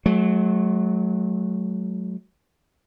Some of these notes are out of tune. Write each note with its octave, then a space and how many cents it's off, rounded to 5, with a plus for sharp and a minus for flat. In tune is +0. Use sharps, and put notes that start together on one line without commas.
F#3 +0 A3 -45